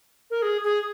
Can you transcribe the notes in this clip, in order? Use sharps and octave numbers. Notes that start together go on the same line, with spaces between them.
A#4
G#4
G#4